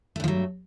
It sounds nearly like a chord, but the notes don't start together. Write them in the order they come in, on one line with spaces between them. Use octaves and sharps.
A3 G2 F3 F#3